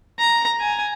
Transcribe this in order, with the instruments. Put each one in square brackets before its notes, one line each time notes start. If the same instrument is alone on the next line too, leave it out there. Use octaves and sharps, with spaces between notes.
[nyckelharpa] A#5
G#5